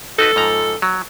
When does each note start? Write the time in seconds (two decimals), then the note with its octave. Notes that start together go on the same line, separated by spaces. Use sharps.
0.19 D#4 F#4 A4 B4
0.36 G#2 F3 A#5
0.82 F#3